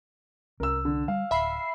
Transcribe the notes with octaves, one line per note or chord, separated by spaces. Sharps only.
C2 C#4 A#4 E6
D3
G3 F5
D1 E5 B5 C7